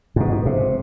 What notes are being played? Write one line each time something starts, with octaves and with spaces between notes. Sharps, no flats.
G#2 B2
C3